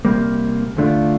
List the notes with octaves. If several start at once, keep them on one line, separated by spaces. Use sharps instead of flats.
C3 G3 A#3
D2 D3 A3 D4 F4